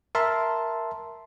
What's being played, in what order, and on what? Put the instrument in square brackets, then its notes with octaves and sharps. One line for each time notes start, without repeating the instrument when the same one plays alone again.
[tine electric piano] A#4 E5 A5 C6